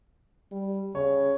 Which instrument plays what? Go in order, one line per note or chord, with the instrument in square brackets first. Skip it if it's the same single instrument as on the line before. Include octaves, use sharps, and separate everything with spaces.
[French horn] G3
[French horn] C#3 [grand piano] C#5